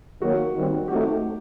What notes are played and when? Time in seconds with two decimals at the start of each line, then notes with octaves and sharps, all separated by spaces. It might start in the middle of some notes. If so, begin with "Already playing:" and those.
0.21 D#3 F#3 A#3 F#4
0.54 D#3 G3 C4
0.88 F#3 A3 C4 D#4 F#4 G4